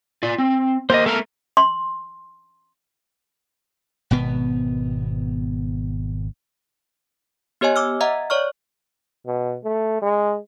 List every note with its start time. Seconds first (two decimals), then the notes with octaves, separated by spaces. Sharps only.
0.23 F4 D5
0.38 C4
0.90 A#3 G4 A#4 C5 D#5
1.06 A3 A4 A#4 A#5 F6
1.57 C6
4.11 G#1 B2 B3
7.61 B3 G4 C#5 D#5 G#5
7.76 D6 E6 F6
8.01 D#5 E5 F#5 A#5
8.30 C#5 D5 C#6 F6
9.27 B2
9.64 A3
10.02 G#3